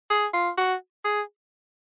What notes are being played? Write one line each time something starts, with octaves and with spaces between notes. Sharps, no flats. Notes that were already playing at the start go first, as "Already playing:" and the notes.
G#4
F4
F#4
G#4